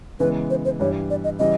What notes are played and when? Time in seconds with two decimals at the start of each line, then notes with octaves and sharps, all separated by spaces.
0.20 C#3 E3 G#3 B3 B4
0.50 C5
0.65 C5
0.80 G2 E3 G3 C#5
1.10 D5
1.24 D#5
1.39 C#3 E3 G3 D#5